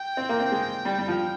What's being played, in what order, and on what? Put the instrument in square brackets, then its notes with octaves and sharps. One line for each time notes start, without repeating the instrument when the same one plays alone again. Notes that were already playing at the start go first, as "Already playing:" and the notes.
Already playing: [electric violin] G5
[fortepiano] C4
A#3
C4
G#3
G3
G3
F3